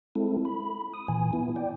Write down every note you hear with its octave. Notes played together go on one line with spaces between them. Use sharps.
G#3 C4 E4 A4
B5
D#6
A#2 E3 G#5
B3 E4
D5 G5